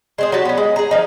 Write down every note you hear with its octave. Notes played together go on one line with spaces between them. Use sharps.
G#3 C4 G#4
F#3 F#4 G4 A5
B3 C#4
G#3
G#4 A#5
F3 D#4